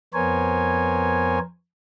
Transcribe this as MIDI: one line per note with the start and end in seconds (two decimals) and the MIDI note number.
0.14 1.39 41
0.14 1.39 59
0.14 1.39 70
0.14 1.39 72
0.14 1.39 73
0.14 1.39 80